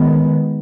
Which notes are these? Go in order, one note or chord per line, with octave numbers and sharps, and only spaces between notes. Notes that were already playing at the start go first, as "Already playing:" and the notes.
Already playing: D#3 G#3 B3